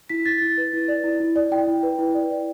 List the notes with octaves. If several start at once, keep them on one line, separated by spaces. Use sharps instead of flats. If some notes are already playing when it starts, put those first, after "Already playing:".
E4 B6
E4 A6
E4
B4
E4
D5
E4
E4
D5
E4 G5
E4
B4
E4
D5
D5